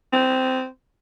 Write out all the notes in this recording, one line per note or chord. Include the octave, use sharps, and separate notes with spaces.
C4